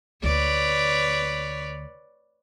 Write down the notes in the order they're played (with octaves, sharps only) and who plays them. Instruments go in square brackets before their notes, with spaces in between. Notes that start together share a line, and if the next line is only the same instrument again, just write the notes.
[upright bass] D2 [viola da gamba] B4 C#5 D5